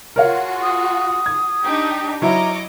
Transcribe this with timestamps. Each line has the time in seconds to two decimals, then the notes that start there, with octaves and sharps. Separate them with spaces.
0.16 F4 F#4 G#4 A#4 C#5 F5
0.62 D#6
1.26 G#6
1.64 D4 D#4 G4
2.22 F#3 E4 C#5 D#5 A#5 D6